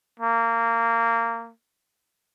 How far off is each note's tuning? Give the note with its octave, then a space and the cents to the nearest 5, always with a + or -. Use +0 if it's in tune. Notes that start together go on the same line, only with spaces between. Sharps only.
A#3 -20